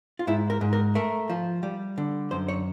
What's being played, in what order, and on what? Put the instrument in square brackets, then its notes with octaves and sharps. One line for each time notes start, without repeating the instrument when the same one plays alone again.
[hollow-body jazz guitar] F4
G#2 E4
A#4
G#2
A#4
A3 A#4
F3
G3
D3
F#2 C5
C#5